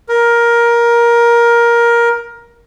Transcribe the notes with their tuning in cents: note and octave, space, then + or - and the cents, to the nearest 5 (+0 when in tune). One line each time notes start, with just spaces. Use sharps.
A#4 +15